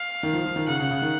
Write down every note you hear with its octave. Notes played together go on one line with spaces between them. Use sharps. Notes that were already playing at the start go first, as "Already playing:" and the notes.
Already playing: F5
D#3
F3
F3
D#3
C#3 F#5
C#3
C#3
D#3